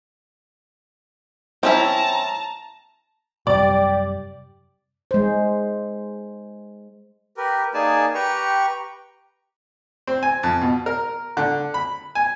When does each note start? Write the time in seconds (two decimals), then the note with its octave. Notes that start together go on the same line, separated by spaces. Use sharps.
1.63 C4 C#4 E4 A5 A#5
3.47 F#2 C3 G3 G4 D5
5.11 G#3 C5
7.37 G4 A#4 B4
7.74 A#3 D#4 G#4 D5 G#5 A5
8.14 G4 B4 G5 A#5 C#6
10.07 C4
10.23 G#5
10.43 F2
10.62 B2
10.86 A#4
11.37 D3
11.74 B5
12.15 G#5